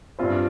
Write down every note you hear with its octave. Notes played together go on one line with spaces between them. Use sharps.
G2 G3 C4 F4 C5